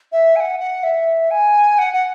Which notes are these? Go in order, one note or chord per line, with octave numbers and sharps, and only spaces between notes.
E5
G#5
F#5
F#5
E5
G#5
F#5
F#5